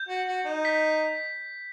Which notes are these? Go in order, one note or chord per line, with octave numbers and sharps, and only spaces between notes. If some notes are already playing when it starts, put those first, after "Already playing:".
Already playing: G6
F#4
F#4
D#4
B6